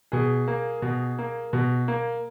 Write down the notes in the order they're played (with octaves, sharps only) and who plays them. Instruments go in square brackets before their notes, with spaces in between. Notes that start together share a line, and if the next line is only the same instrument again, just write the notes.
[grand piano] B2 G#4
A#3
B2
A#3
B2
A#3